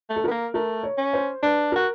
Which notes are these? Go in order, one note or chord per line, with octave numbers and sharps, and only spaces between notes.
A3
A4
B3 A#4
A#3
A3 A#4
C#5
C#4
C5
D4 B4
F#4 A#4